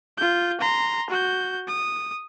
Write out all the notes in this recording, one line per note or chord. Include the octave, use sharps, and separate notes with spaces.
F4 G6
A#5 C6
F#4 G6
D#6